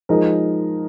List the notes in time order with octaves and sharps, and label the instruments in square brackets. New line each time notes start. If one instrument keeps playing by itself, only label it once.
[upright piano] F3 G#3 D#4 A#4 D#5